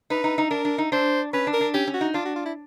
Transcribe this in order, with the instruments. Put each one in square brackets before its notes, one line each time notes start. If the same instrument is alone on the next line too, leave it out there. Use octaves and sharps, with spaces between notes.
[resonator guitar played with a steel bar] D#4 [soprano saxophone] B4
[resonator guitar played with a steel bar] D#4
D#4
[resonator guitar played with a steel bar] D4 [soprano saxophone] A#4
[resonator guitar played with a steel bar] D4
D#4
[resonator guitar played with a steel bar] D4 [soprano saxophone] C5
[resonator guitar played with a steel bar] C#4 [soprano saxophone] B4
[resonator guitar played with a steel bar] D4
[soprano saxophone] A#4
[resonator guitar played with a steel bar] D4
[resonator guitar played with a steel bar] C#4 [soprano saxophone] G4
[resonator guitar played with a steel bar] C#4
[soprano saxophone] F#4
[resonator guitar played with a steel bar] D#4
[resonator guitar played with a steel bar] D4 [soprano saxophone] F4
[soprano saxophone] F#4
F4
E4